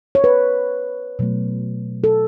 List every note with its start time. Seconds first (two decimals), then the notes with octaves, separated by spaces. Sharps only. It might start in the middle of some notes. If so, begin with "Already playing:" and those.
0.15 C#5
0.24 B4
1.19 B2 F#3 A3
2.04 A4